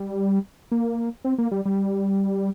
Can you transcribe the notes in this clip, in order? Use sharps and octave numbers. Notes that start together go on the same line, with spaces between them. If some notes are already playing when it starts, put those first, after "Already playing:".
Already playing: G3
A#3
C4
A#3
G3
G3